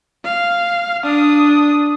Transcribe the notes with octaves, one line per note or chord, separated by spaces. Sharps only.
F5
D4 D#6